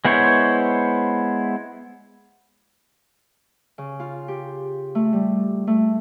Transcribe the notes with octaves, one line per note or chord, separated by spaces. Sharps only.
G#3 B3 E4 C5 C#5
C#3
F4
G4
A3
G3
A3